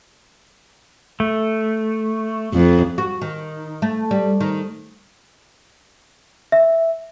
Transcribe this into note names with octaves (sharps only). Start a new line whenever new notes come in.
A3
F2
F#4
D#3
A3
G3
D#3
E5